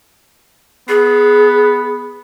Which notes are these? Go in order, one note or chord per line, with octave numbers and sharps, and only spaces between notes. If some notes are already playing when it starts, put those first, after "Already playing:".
B3 G#4